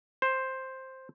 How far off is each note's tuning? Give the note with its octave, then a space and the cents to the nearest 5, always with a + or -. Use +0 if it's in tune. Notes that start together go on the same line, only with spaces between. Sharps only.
C5 +5